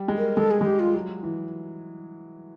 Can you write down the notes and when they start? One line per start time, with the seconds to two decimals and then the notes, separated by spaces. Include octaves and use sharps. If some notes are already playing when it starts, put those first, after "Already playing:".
Already playing: G3
0.08 G#3
0.18 A#4
0.37 G#3 A4
0.51 G#4
0.61 G#3
0.65 G3 G4
0.80 F4
0.94 F#3
1.23 E3